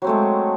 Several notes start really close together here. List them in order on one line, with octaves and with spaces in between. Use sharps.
F#3 C4 A3 G#3